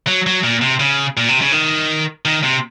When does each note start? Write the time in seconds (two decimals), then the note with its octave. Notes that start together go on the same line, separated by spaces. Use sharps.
0.07 F#3
0.26 F#3
0.44 A#2
0.62 C3
0.80 C#3
1.17 A#2
1.29 C3
1.41 C#3
1.52 D#3
2.25 D#3
2.44 C3